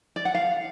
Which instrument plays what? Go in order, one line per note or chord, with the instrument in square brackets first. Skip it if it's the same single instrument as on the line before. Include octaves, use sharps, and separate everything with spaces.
[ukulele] D5
F#5
F5